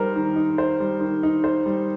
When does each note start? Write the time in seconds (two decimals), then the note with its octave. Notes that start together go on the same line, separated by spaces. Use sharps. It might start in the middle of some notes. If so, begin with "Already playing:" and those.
Already playing: G3 D#4 A#4 C5
0.16 D#3
0.36 D#4
0.58 C5
0.80 G3
1.01 D#3
1.23 D#4
1.44 C5
1.66 G3